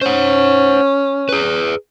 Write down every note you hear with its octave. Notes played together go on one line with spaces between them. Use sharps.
C#4 C5 F#5
G#4 B4